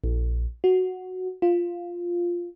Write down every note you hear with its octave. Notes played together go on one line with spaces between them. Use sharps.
A#1
F#4
F4